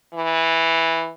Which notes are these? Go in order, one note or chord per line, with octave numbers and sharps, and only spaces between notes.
E3